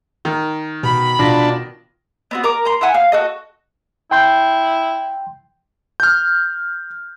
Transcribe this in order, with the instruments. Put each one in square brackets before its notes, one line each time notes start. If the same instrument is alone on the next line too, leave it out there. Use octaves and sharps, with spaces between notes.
[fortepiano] D#3
[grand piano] B2 [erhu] B5
[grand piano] B2 F4 A#6 [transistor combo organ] D4
[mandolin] B3 C4 F#4
A#4 A#5 D6
A#5 C6
E4 E5 F#5 G#5
F5 F6
F#4 A4 D#5
[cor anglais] E4 [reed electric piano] G5 C6 G6
[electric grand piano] F6 G6